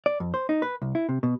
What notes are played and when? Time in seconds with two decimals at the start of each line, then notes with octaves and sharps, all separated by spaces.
0.06 D5
0.20 F2
0.34 C5
0.49 D#4
0.62 B4
0.82 C2
0.95 E4
1.09 C3
1.23 B2